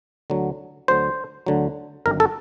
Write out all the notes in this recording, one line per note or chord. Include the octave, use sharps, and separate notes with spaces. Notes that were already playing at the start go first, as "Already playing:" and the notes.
D2 D3 F#3
D2 D3 F#3 C5
D2 D3 F#3
G1 F#2 D#3 A#4
A4